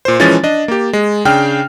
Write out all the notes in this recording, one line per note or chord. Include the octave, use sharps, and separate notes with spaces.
A#2 C5
E3 F3 G#3 C#4 A6
D4 D#5
A#3 G4
G#3
C#3 D4 G5 F6